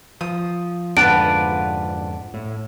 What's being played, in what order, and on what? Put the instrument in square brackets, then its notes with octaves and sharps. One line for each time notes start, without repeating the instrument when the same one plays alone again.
[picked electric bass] F3 [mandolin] D#6
[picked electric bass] F2 G#2 D3 [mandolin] D4 F4 B4 [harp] F#5 [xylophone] D7
[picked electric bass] A2